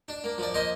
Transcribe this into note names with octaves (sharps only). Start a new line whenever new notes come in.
D4
A#3
F3 D5
A#3 C5 D#5